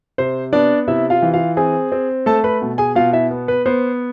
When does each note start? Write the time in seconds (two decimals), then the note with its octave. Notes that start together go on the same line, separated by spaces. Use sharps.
0.18 C3 C5
0.53 B3 D4 D5
0.88 C3 E4 E5
1.10 F4 F5
1.22 E3
1.34 F4 F5
1.57 C4 G#4 G#5
1.92 C4
2.26 A3 A4 A5
2.44 B4 B5
2.62 B2
2.78 G#4 G#5
2.96 B2 F4 F5
3.13 E4 E5
3.31 B3
3.48 B4
3.66 B3 C5